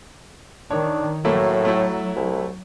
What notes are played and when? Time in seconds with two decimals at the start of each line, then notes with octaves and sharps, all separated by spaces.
0.71 D#3 D4 C#5
1.25 A2 F#3 A3 A#3 E4
1.65 A3 E4
2.16 C2